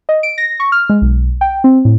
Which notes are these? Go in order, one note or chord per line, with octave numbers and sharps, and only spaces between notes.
D#5
D7
A#6
C#6
F6
G#3
B1
G5
C4
A2